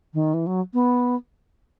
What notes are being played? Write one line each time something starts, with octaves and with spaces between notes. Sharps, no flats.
D#3
E3
F#3
B3